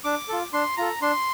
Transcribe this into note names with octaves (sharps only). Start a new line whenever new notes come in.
D4 D6
F4 A4
D4 C6
F4 A4 A#5
D4 C6